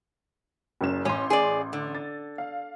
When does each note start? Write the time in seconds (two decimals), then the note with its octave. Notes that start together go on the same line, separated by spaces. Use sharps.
0.81 F#1 F#2 E7
1.05 A1 C#4 C6
1.30 G#4 D5
1.73 D3
1.95 A6
2.38 F5